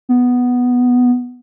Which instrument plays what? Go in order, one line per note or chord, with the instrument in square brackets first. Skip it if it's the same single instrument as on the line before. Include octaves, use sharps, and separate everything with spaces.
[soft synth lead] B3